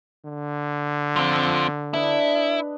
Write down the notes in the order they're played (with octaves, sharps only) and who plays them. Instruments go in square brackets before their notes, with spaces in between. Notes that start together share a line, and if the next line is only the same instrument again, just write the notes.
[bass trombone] D3
[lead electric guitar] F3 C4
[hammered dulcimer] D4 B4 D#5 [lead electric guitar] E4